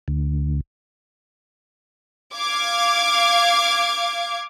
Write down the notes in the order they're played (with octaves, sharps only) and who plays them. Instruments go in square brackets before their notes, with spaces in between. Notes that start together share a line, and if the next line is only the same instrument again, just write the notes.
[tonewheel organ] D2
[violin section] F5 D6 G#6